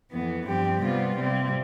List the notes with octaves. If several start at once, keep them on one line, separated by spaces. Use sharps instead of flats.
F2 E3 B3
G2 F3 C4 G4
C3 G3 B3 F4
C3 G3 C4